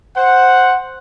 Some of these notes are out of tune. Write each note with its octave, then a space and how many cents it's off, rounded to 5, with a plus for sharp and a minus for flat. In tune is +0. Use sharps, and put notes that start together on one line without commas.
C5 +0 F#5 +0